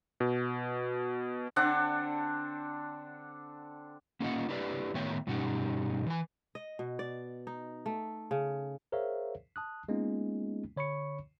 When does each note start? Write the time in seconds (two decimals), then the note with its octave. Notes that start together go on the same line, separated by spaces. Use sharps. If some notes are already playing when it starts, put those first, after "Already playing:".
0.20 B2
1.56 D3 C4 D4 F#5
4.20 A#3 C#4 F4 A4 D#5 F#5
4.49 D4 E4 G4 B4 C5 D5
4.94 A2 D#3 B3 C#5 E5 G5
5.27 G2 B2 C#4 D#4 F#4 G4
6.06 E3 G#5
6.55 D#5
6.79 B2
6.99 D5
7.47 D#4
7.86 A3
8.31 C#3
8.92 G#4 A#4 C5 C#5 E5 F5
9.56 A5 D#6 F#6
9.89 G#3 A#3 B3 C#4 D#4 F4
10.77 D3 C#5 B5 C#6 C#7